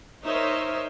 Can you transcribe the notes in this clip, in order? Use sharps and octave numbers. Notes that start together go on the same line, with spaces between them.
D#4 A#4 C5 C#5 D#5 E5